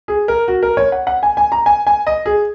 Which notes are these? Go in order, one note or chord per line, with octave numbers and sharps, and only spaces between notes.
G#4
A#4
F#4
A#4
C#5
F#5
F#5
G#5
G#5
A#5
G#5
G#5
D#5
G#4